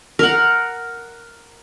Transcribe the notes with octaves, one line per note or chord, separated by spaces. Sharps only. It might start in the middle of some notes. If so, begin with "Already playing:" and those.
A#4 F#5